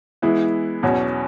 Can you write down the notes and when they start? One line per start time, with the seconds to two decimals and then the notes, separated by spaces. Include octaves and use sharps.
0.22 E3 G#3 B3 E4
0.83 E2 B2 F#3 C#4 F#4